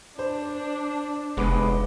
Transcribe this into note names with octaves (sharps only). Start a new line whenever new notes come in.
D4 C5
F1 G#3 B3 D6